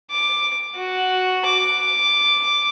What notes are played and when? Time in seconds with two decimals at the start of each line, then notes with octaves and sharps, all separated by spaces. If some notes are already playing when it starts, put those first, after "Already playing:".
0.11 D6
0.75 F#4
1.46 D6